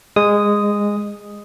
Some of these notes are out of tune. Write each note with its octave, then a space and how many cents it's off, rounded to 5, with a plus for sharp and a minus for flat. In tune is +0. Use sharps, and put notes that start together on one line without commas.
G#3 -15 D#6 +0